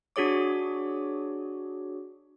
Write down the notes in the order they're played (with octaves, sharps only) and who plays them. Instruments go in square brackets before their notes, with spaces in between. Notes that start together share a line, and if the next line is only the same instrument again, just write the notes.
[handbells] D4 F#4 G#4 C#5 D6